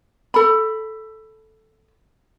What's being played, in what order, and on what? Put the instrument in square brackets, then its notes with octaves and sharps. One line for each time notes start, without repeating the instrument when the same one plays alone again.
[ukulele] A4 B5